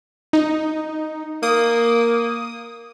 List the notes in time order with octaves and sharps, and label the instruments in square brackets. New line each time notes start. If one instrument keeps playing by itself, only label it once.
[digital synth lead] D#4
[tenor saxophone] A#3 [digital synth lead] D#6